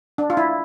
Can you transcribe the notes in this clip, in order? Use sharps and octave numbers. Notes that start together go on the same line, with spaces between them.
D4
F4
E4